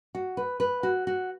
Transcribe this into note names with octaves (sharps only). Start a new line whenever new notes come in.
F#4
B4
B4
F#4
F#4